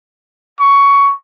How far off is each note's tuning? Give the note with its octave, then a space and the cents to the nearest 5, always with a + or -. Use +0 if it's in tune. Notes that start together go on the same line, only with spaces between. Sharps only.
C#6 +15